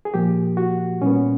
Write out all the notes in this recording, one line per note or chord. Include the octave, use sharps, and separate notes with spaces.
G#4
A#2 F3 A#3 G4
F#4
A#2 G3 B3 C#4